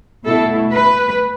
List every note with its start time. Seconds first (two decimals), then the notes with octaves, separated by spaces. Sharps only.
0.25 B2 A3 E4 A4
0.71 B4